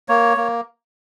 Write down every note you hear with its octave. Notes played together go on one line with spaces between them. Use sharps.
A#3 C#5
A#3